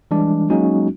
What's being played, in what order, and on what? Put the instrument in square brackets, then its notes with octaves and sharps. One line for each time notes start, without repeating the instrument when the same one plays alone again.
[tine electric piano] E3 G3 G#3 D4
F#3 G#3 A#3 C#4 D#4 F#4